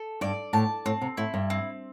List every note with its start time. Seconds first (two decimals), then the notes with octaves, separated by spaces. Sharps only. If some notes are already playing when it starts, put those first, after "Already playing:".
Already playing: A4
0.21 G2 D5
0.53 A2 A5
0.86 A2 C4
1.02 C3
1.17 A2 E4
1.34 G2
1.50 C4